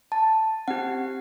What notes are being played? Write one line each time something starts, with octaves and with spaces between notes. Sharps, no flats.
A5
C4 G4 F#5